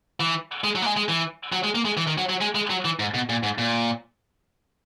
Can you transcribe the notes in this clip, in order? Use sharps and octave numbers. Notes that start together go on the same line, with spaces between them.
E3
G#3
F#3
A#3
G#3
G#3
E3
F#3
G#3
A#3
G#3
E3
D#3
F#3
F#3
G#3
G#3
F#3
E3
G#2
B2
A#2
G#2
A#2